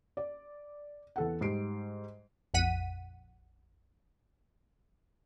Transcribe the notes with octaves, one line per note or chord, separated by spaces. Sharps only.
D5
E2 A4 F#5
G#2 G3 C7 D7
A#1 F2 F#5 B6 D#7